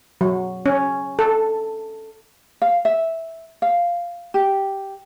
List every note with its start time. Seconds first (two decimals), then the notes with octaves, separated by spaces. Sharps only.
0.21 F#3
0.66 C#4
1.19 A4
2.62 F5
2.85 E5
3.62 F5
4.34 G4